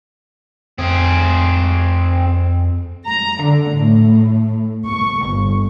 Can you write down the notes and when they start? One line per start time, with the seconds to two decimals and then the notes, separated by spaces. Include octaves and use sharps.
0.78 F2 C4 G#4
3.06 A#5
3.40 D3
3.76 A2
4.86 C#6
5.26 G1